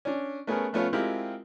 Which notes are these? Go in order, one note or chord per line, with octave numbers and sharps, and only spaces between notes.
C#4 D4
A3 B3 C#4 G#4 A#4
F3 A3 B3 C#4 F4
G#3 C4 E4 F4 G4 A#4